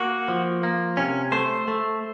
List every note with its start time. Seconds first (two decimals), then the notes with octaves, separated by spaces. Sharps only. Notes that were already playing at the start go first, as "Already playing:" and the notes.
Already playing: A#3 F#4
0.28 F3
0.63 A#3
0.97 C3 C#4
1.32 A3 C5
1.68 A3